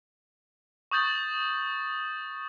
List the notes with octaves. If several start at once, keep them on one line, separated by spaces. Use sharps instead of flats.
C#6 D#6 G6 A6 F#7